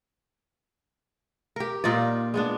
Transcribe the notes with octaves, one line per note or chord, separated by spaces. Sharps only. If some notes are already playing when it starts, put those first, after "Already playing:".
G4 A#4
A#2 D#4 F4 D5
G#3 B3 D4